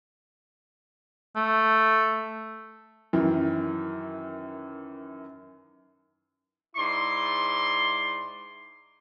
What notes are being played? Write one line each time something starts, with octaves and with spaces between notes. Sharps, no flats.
A3
F#2 D#3 E3
G#2 E4 D5 C6